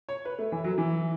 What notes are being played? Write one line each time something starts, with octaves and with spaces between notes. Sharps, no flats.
C#5
B4
A3
E3
F#3
E3